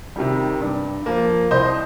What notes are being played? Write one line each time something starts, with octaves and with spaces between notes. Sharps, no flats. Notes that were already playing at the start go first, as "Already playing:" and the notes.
C3 D#3 G3
G2
F3 A#3
C2 C5 D#5